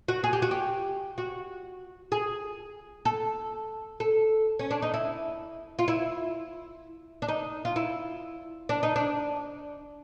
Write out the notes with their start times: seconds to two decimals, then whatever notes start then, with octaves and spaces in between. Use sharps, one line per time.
0.08 F#4
0.24 G#4
0.33 G4
0.42 F#4
0.51 G4
1.18 F#4
2.12 G#4
3.05 A4
4.00 A4
4.59 C#4
4.71 D4
4.82 D#4
4.94 E4
5.79 F4
5.88 E4
7.22 D4
7.28 D#4
7.65 F4
7.76 E4
8.69 D4
8.83 D#4
8.96 D4